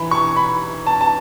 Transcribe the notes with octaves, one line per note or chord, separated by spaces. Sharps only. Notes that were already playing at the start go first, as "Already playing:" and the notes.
Already playing: E3 B5
C#6
B5
A5
A5